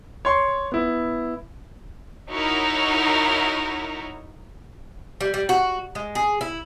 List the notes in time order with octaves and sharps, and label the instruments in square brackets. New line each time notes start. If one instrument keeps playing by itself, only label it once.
[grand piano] C#5 C6 C#6
B3 E4
[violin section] D#4 E4 F#4 A#4 C#5
[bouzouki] G3
G3
F#4
G#3
G#4
E4